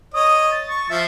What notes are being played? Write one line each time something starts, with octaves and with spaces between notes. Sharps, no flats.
C#5 D#5 D#6
A6
C#6
F3 E5